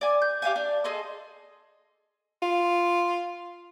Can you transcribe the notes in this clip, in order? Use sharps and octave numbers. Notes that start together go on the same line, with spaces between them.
D5 G#5
G6
G4 F5 G5 G#5
D4
G#4 A4 D#5 C6
F4